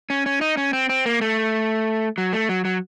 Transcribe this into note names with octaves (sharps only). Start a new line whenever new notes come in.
C#4
C#4
D#4
C#4
C4
C4
A#3
A3
F#3
A3
F#3
F#3